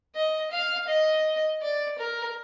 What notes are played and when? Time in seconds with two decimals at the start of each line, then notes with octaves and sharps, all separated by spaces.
0.15 D#5
0.51 F5
0.88 D#5
1.62 D5
1.98 A#4